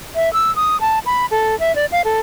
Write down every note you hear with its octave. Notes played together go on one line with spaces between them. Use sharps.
E5
E6
D#6
A5
B5
A4
E5
D5
F5
A4